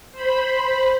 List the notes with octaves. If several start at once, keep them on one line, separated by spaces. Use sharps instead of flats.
C5 B5